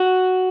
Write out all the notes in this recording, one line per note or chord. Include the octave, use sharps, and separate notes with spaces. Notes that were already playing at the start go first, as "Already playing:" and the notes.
Already playing: F#4